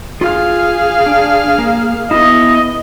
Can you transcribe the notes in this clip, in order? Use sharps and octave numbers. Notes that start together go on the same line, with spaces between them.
F4 G#4 F5 F6
D4
A#3
B3 E4 D#5